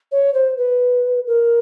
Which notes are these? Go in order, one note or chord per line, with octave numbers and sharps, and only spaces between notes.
C#5
C5
B4
A#4